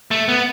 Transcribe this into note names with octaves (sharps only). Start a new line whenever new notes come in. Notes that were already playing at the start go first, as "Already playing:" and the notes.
A3
B3